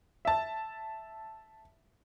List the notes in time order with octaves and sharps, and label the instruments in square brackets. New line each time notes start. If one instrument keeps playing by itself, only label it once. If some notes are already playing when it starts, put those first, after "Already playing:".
[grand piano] E5 A5